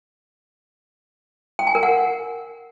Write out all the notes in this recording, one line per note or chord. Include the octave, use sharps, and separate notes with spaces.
G5
G#5
A#4
F#5